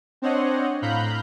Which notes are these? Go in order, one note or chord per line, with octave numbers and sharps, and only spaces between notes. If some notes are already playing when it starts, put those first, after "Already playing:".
C4 D4 C5 C#5 D#5 F#5
A2 F5 A#5 B5 F#6 G6